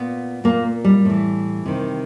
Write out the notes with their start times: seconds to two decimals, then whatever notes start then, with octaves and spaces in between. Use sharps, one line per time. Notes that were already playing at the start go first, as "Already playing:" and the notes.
Already playing: A#2 B3
0.44 A#2 A#3
0.84 G3
1.05 A2 E3
1.66 C3 D#3